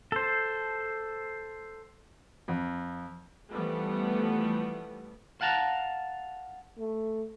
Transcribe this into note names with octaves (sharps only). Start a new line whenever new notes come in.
A4 C5
F2
E3 F3 G3 A3 B3
F5 F#5 A5 A#5
A3